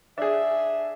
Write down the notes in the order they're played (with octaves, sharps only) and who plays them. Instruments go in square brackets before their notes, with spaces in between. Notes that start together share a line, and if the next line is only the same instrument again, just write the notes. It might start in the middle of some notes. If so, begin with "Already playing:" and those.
[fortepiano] D4 G#4 [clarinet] E5